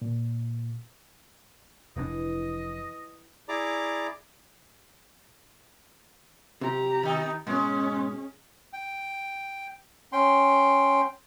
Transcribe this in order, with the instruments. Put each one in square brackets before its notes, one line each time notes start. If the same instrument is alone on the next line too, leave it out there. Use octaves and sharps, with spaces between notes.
[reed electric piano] A#2
[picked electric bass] F1 B2 D4 [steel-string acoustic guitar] E3 [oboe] D#5
[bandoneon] E4 G#4 D5 A#5 D6
[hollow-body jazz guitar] C3 [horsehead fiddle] G4 A#5
[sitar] D#3 D#4
[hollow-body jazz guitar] G#2 B2 C#5 [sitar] G#3 [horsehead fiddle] C#4
[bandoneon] G5
C#4 G5 C6